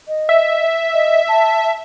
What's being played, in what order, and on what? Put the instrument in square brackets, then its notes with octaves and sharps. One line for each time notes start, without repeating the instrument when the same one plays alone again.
[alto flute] D#5
[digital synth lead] E5
[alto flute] D#5
A5